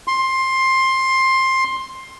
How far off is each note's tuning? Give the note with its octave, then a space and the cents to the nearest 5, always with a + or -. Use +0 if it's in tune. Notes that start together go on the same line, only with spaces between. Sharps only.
C6 +15